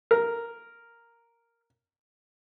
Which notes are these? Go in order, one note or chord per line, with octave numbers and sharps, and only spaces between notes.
A#4